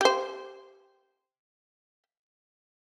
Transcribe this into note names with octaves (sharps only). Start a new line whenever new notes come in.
G4 C5